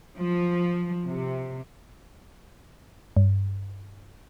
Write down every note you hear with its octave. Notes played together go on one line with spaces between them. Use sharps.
F3
C3
G2